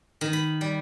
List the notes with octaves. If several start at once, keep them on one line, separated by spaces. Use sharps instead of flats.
D#3
B5
G3